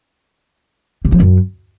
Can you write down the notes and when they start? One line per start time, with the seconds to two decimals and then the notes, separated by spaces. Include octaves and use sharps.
1.05 C3
1.12 F3
1.20 F#2